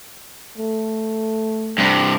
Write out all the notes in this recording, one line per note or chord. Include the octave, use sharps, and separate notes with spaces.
A3
G2 C3